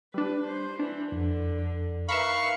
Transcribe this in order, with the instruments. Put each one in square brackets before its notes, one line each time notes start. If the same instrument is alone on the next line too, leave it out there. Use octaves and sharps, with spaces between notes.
[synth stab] G3 D4 [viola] B4
[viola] C5
[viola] E3 [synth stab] D4
[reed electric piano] F2 [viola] D3
[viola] D#3 B4 [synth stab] E5 A#5 B5 [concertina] F5 C#6